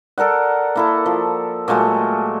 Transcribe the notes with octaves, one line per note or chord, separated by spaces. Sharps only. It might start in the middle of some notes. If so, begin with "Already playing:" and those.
A4 A#4 D5 F#5
A#3 E4 A4
F3
A#2 F#3 G#3 A3